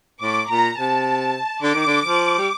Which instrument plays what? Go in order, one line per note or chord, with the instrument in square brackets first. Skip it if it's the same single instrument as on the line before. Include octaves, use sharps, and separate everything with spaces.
[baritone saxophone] A2 [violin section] D6
[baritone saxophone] A#2 [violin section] A#5
[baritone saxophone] C3 [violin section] A5
[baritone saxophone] D3 [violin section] D6
[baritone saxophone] D#3
D3
F3
G3